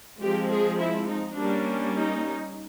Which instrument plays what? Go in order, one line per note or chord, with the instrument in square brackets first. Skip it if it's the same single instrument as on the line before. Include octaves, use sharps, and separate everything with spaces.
[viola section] F3 G#3 C4 G4
G#4
E4
D#4
G3 A#3 C#4 D4
D#4